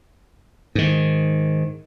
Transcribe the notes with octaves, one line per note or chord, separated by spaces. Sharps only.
G#2 D#3